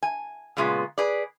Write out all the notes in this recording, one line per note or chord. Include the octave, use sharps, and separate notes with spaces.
G#5
A#2 C#3 G#3 B3 F4
G#4 B4 D5